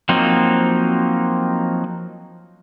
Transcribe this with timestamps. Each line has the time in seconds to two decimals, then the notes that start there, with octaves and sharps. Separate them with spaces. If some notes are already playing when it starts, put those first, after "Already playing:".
0.09 F3 F#3 A#3 C4 D#4